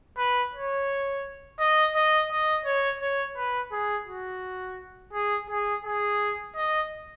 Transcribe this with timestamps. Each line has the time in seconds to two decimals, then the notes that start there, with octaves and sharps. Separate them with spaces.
0.17 B4
0.54 C#5
1.59 D#5
1.95 D#5
2.31 D#5
2.65 C#5
3.01 C#5
3.36 B4
3.72 G#4
4.08 F#4
5.13 G#4
5.50 G#4
5.85 G#4
6.56 D#5